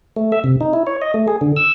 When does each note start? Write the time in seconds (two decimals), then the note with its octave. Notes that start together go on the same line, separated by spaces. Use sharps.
0.16 A3
0.32 E5
0.44 C3
0.61 D#4
0.73 E4
0.87 C#5
1.02 D#5
1.14 A3
1.28 G#4
1.41 D3
1.56 E6